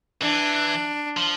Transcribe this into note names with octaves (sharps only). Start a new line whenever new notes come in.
E3 D4
F3